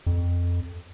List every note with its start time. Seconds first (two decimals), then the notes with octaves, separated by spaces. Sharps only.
0.07 F2